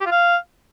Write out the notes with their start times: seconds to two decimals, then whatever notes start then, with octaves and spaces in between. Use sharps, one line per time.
0.01 G4
0.06 F4
0.11 F5